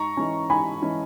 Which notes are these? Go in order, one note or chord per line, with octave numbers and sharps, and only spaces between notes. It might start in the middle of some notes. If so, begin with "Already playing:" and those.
Already playing: G#2 A#5 C#6
E3 G#3 C#4
G#2 G#5 B5
E3 G#3 C#4